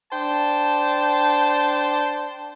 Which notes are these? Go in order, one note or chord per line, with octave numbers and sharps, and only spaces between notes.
D4 C5 G5 A5